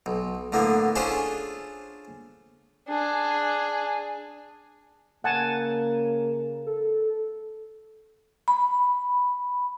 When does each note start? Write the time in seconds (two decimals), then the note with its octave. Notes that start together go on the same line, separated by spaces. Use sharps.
0.06 B1
0.52 A2 D3 A#3 B3
0.96 C#4 D4 F4 G#4 A4 C5
2.88 D4 G#4
5.24 C#3 A#3 F#5 G#5 A5
6.67 A4
8.48 B5